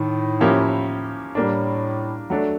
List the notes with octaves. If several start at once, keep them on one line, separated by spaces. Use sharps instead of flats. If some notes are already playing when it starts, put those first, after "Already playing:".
Already playing: A2 D#3
F3 A#3 C#4 E4 G4
A2 G3 A#3 D4
F#3 A3 D4